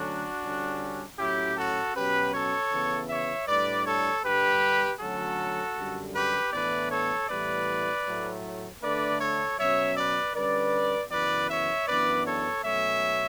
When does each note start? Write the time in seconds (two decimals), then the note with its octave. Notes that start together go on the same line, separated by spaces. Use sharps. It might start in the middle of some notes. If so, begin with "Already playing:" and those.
Already playing: D3 F#3 A3 C#4 D4 F#4
0.43 D3 G3 C#4
1.19 A2 F#3 C#4 E4 G4
1.57 F#4 A4
1.95 B2 F#3 C#4 G4 B4
2.34 A4 C#5
2.72 C#3 E3 B3
3.10 C#5 E5
3.48 A2 G3 D4 B4 D5
3.86 A4 C#5
4.24 G2 D3 G3 G4 B4
5.00 D3 F#3 A3 C#4 F#4 A4
5.77 F#2 D3 G3
6.15 G4 B4
6.53 A2 E3 B3 D4 B4 D5
6.91 A4 C#5
7.29 A2 E3 G3 B3 B4 D5
8.06 A2 F#3 A3
8.82 D3 A3 D4 B4 D5
9.20 A4 C#5
9.58 B2 F#3 C#4 C#5 E5
9.97 B4 D5
10.35 D3 G3 C#4 B4 D5
11.11 F#2 C#3 E3 B3 B4 D5
11.49 C#5 E5
11.88 F#2 E3 B3 D4 B4 D5
12.25 A4 C#5
12.64 B2 F#3 A3 C#4 C#5 E5